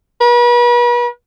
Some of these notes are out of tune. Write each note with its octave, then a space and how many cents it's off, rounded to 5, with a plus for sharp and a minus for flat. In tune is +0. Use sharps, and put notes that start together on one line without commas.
B4 -40